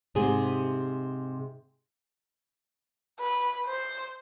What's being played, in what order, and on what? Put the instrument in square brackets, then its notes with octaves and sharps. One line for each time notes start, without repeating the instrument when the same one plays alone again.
[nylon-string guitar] G#2 C3 G#4
[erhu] B4
C5